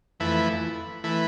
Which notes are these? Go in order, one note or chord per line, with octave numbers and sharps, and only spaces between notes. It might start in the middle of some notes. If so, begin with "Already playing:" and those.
F2 E3 A3 E4 B4
E3 A3 E4 B4